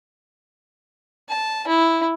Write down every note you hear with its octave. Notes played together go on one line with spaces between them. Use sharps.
A5
E4